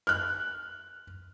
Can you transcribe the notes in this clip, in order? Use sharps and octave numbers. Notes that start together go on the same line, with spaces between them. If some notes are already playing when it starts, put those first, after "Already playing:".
F6 F#6